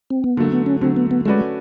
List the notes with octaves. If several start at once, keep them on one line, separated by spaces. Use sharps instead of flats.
C4
B3
D3 F#3 A3 A#3
B3
C#4
D3 F#3 A3 C4
B3
B3
G#3 A3 C#4 F#4 B4 D5